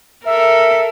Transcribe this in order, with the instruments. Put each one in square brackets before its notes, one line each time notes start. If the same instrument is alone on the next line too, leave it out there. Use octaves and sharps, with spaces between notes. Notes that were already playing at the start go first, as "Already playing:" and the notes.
[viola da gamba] A4 A#4 [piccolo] E5